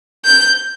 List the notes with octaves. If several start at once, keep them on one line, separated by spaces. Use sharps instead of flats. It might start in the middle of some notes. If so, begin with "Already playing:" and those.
G6